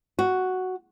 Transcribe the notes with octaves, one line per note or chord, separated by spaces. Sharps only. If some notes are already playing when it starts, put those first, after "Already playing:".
F#4